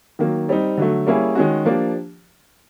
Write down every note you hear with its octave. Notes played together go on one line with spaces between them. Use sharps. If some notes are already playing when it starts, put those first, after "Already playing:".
D#3 F#3 A#3
G3 C4 D#4
D3 F#3 A3
G3 A#3 C#4 E4 G#4
D#3 G#3 C#4 F#4
F3 A#3 D4 G4